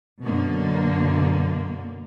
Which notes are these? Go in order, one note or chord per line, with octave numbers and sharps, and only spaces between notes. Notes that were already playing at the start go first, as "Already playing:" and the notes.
F#2 B2 D3 A#3